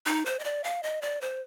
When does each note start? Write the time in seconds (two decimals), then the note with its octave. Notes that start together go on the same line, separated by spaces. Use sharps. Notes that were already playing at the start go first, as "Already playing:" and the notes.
0.06 D#4
0.26 C5
0.39 D#5
0.44 D5
0.64 F5
0.83 D#5
1.02 D5
1.21 C5